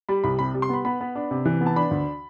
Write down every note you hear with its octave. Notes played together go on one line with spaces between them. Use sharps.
G3 B5
C2 B5
C3 B5
G3
C6
B3 B5
B3 B5
B3
D4
C3
E3
B3
A5
D4 B5
D2